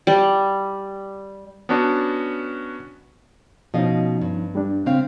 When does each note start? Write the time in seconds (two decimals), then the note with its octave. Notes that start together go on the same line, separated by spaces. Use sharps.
0.07 G3
1.69 B3 C#4 D4 F#4 A5
3.74 B2 F3 C#4 D#4 D#5 F5
4.22 G2
4.55 G3 D4
4.86 C#3 C4 F5